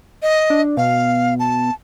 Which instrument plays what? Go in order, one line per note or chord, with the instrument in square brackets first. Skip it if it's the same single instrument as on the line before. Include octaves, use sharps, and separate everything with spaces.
[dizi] D#5
[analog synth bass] D4
[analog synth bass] B2 [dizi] F5
[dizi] A5